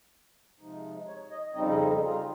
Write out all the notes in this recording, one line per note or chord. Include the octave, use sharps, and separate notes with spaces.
C3 F3 G#3 D#4
C#5
D#5
F2 C#3 G3 C4 D#4 D#5
D#5
G#4
F4